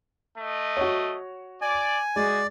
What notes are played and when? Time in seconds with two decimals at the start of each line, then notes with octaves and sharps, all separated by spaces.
0.37 A3 D#5
0.77 F#4 C#5
1.62 D5 G#5
2.16 G#3 F#4 G#4 D5